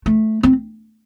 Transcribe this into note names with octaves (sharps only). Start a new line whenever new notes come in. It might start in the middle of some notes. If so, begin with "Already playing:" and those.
A3
C4